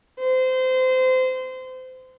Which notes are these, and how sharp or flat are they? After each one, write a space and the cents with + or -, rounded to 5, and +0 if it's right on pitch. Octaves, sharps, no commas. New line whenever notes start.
C5 -25